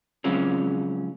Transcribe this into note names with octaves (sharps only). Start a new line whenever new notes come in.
C#3 F3 F#3 G#3 C4 C#4